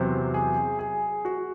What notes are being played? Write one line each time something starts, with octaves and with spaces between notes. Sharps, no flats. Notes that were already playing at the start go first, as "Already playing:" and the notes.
Already playing: E2 C3 F#3 C5
G#4
G#4
F#4